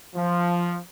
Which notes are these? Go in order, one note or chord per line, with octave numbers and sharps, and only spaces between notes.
F3